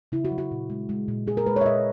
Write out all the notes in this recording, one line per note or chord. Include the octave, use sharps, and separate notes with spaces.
C#3 E4
F#4
F#3
F#4
A#2
G#3
G#3
A#2
G#3 G#4
A#4
G#3 B4
C#5 E5
A#2 D#5